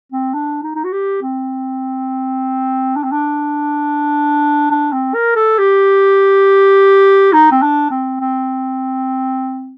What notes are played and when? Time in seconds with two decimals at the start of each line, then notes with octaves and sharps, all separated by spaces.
0.12 C4
0.34 D4
0.63 D#4
0.76 D#4
0.84 F#4
0.92 G4
1.22 C4
2.96 D4
3.04 C4
3.12 D4
4.71 D4
4.93 C4
5.14 A#4
5.36 A4
5.58 G4
7.33 D#4
7.52 C4
7.62 D4
7.91 C4
8.20 C4